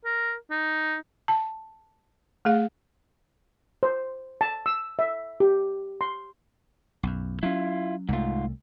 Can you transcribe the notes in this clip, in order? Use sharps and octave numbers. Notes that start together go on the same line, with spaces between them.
A#4
D#4
A5
A3 G#4 F5
C5
A5
E6
E5
G4
C6
B1 F#2
F#3 C#4 E4 F4
C2 G#2 A3 F4